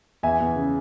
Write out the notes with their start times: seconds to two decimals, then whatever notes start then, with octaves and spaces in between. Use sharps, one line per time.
0.23 E2 E5 G#5
0.41 E2
0.56 C#3